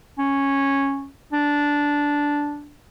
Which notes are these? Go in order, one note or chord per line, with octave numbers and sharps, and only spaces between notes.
C#4
D4